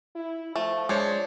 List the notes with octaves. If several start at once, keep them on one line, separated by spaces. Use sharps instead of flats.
E4
F3 A3
G#3 D4 C5 C#5